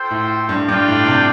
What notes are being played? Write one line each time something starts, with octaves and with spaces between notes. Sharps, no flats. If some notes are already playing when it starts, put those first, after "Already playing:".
Already playing: F4 A4 C5 G5
A2
G2
G2 D4 F4 D5 G5
A2
C3